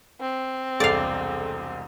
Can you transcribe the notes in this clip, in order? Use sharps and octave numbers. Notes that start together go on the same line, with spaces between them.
C4
E1 C2 G#4 A4 D5 F5